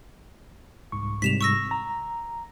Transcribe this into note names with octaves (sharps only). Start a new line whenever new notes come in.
C2 G#2 C#6
G#2 C3 G3 B6 E7 F7
C#6 E6 A#6
A#5